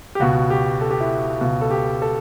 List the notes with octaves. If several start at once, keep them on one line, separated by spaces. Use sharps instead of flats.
G4
C#2 B2 F#4
G4
A4
G4
E4
C#2 B2
A4
G4
A4